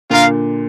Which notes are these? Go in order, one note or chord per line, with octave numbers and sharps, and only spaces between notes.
A#2 D3 F4 A#4 F5